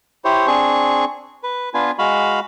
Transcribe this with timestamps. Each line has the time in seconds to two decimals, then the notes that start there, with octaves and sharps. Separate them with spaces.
0.25 E4 G4 C5 C#5
0.47 C4 D4 G#4 C#6
1.43 B4
1.74 B3 D4 F4 B4 G#5
1.99 G#3 F#4 F5 B5